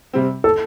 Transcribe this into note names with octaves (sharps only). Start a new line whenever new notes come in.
C3 G3 C4
A4